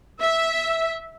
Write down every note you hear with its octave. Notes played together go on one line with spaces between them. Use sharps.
E5